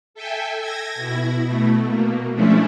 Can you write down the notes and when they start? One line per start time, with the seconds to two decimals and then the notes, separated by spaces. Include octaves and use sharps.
0.14 A4 E5 G5 G#5
0.59 G#6 A#6
0.95 B2 E4
1.45 B2 A3
1.87 B2 A#3
2.33 F3 G#3 A3 C#4 D4 E4